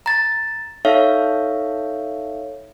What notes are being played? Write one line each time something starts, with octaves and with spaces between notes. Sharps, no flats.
A#5 A6
D#4 A4 C#5 E5 F5